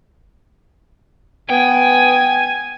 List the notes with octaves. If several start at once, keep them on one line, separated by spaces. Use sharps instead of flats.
B3 G5 G#5